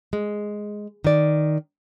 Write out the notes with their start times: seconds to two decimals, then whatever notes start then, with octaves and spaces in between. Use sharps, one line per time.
0.13 G#3
1.04 D#3 D5